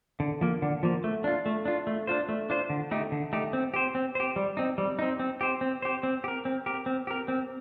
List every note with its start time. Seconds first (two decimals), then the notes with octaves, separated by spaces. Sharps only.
0.20 D3
0.41 F3 A#3
0.62 D3
0.83 F3 A#3
1.04 A3
1.24 D4 F4
1.46 A3
1.65 D4 F4
1.87 A3
2.07 D4 F4 C5
2.29 A3
2.50 D4 F4 C5
2.70 D3
2.91 A3 D#4 G4
3.12 D3
3.33 A3 D#4 G4
3.53 C4
3.74 G4 C5
3.95 C4
4.15 G4 C5
4.36 G3
4.57 C4 D#4
4.78 G3
4.99 C4 D#4
5.19 C4
5.41 G4 C5
5.61 C4
5.82 G4 C5
6.03 C4
6.24 G4
6.28 A#4
6.45 C4
6.66 G4 A#4
6.86 C4
7.07 G4 A#4
7.28 C4